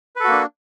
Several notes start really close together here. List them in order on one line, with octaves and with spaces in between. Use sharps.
B4 A4 F#4 A#3 D4